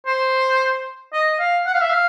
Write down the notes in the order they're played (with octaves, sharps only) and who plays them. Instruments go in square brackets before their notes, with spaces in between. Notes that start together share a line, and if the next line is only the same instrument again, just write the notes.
[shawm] C5
D#5
F5
F#5
F5
E5
F5